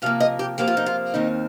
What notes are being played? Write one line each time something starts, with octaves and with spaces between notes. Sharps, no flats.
C3 F3 A#3 F5
D#5
G4
C3 F3 A#3 G4
F4
D#4
F4
D#2 D#3 C4 D#4